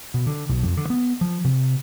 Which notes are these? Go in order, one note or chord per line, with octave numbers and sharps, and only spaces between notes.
B2
D3
B1
F2
D3
B3
F3
C3